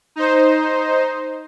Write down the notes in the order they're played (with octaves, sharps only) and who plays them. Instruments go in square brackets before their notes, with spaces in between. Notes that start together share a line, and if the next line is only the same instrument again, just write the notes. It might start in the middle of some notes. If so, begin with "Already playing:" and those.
[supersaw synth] D#4 C5